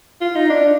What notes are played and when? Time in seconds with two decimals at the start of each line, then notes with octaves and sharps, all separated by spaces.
0.21 F4
0.36 D#4
0.50 D4